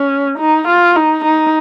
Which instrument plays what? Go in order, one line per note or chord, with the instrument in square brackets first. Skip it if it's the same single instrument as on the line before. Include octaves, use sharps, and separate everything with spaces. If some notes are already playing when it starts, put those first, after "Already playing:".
Already playing: [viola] C#4
D#4
F4
D#4
D#4